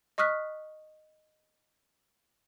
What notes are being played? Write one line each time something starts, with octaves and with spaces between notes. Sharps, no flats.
D#5 C#6 D#6 F6 F#6 B6